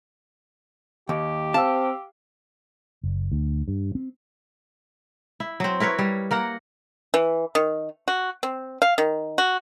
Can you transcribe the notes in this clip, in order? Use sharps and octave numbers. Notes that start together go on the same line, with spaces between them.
D#2 G4
C4 F5 A5 E6
F#1
D2
G2
C4
E4
F#3 C4
E4 A#4 B4 C#5
G3
A#3 A#4 F#5
E3
D#3
F#4
C4
F5
D#3
F#4